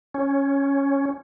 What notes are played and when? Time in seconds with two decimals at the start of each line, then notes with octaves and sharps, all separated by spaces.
0.14 C#4